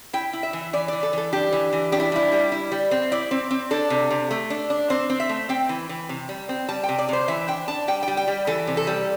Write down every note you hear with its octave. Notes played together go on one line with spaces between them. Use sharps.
E4 G5
E4
E5
E3
E3 D5
E3 D5
A4
E3 A4
D4 G4
E3
E3
D4 G4
E4
G3 E4
G3
E4
G3
C4
E4 D5
C4
C4
D4 A4
C3
C3
A3
D4
D4
C4 C5
C4
E5
A3
C4 G5
E3
E3
C3
G3
C4
G3 A5
G5
C3
D5
C3 C5
E3 E5
D4 G5
D4 A5
G3 G5
G5
G3
G5
G3
E3 A4
C3
A4
G3